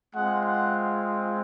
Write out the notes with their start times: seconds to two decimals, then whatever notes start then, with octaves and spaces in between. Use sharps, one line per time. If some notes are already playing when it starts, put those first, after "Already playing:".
0.14 G#3 C4 F4 F#5
0.43 F#5